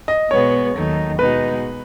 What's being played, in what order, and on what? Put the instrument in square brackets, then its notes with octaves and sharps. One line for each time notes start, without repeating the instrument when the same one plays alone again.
[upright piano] D#5
[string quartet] B2 G#3 B3 [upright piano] C#5
[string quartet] D#2 D#3 F#3 A3 D#4
[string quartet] B2 G#3 D#4 F#4 [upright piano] B4